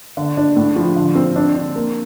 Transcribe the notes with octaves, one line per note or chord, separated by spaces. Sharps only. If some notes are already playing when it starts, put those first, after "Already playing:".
D3
D4
A2
F3
D3
C4
D4
D4
A#3